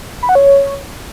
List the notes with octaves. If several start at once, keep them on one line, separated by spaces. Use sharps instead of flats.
B5
F#5
C#5